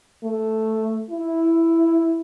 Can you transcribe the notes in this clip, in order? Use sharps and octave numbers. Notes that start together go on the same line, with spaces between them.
A3
E4